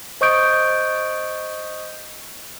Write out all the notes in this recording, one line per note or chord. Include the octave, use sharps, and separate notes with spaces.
C5 D#5 C#6 D#6 G6 D7